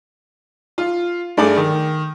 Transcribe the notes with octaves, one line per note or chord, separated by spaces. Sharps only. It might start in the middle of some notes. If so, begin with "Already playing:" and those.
F4
G2 A3 G#4 D5
D#3